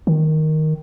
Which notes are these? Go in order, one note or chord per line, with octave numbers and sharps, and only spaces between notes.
D#3